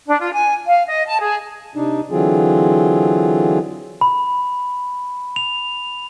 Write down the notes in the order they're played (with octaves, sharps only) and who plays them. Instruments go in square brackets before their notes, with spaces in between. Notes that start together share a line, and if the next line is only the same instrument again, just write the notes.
[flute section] D4
F4
G#5
F5
D#5
A5
G#4
[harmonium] C3 D4 D#4
D3 E3 F#3 C4 F4 G#4
[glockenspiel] B5
F7